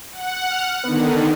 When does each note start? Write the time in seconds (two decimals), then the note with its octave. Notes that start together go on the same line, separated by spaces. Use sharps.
0.12 F#5
0.51 F6
0.84 D3 D#3 B3